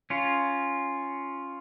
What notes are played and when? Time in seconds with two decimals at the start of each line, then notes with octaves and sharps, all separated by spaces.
0.10 C#4 F4